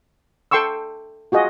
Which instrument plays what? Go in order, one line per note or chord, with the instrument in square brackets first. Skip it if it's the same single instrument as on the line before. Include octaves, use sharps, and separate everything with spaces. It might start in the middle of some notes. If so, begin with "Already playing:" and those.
[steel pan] A4 G5 C6 C#6 E6
F4 F#4 G#4 D#5